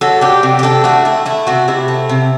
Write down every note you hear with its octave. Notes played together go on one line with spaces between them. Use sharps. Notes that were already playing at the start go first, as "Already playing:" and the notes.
F#3 A4
D4 G4
C3
G4
D4 A4
A3 F#4
A3 E4
A3 E4
C3 F#4
C3 E4
A3
C3